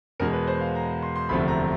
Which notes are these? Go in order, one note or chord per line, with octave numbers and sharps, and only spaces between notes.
E2 B2 G#3 A#4
B4
C5
F5
A#5
C6
C6
E1 D2 C3 F3 A3 B5
A#5